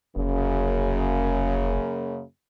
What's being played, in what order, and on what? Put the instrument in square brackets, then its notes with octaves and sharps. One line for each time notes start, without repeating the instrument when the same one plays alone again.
[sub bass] F1 [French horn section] F#2 C#3 A#3